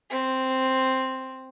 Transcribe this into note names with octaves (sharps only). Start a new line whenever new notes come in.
C4